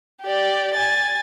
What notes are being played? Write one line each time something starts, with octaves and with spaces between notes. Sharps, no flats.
G4 D5
G#5 A6